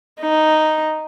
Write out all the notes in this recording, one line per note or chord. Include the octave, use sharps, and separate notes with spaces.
D#4